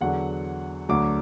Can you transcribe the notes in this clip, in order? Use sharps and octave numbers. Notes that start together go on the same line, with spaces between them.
E2 D3 F#3 F#5
D2 D3 F#3 D6